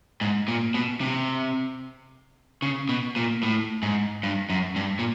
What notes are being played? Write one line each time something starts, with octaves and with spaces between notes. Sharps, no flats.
G#2
A#2
B2
C3
C#3
B2
A#2
A2
G#2
G2
F#2
G2
A#2